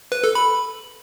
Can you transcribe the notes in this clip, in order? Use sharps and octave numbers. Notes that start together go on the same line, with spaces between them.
B4
A4
B5